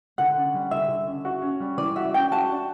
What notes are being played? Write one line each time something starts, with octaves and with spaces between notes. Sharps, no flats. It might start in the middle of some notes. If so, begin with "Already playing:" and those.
D3 F#5
C#4
G3
D3 E5
D3
C#4
F#4
C#4
G3
E3 D5
F#4 E5
C#4 G5
F#4 A5
D4